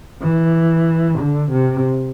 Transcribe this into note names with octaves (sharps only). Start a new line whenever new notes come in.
E3
D3
C3